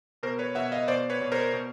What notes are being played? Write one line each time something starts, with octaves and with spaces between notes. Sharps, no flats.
B2 A#4 C5
B4 C#5
B2 E5 F#5
D#5 F5
B2 C5 D5
B4 C#5
B2
A#4 C5
B2